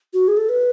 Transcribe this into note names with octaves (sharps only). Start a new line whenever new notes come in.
F#4
G#4
A4
B4